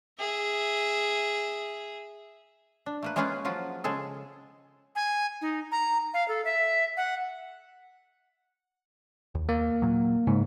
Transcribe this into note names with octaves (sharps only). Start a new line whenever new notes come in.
G#4 E5
D4
A3 A#3 B4
G#3 A#3 C#4 F4 G#4 B4
F3 F#3 F4
C#3 G#3 G#4 A4
G#5
D#4
A#5
F5
A4
E5
F#5
D#2
A#3
A#2 F#3
G#2 C#3